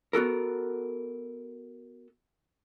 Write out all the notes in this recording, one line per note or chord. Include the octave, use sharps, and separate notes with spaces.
B3 F#4 A4 A#4